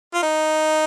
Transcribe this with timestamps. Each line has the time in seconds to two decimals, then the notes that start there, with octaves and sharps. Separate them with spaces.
0.14 F4
0.23 D#4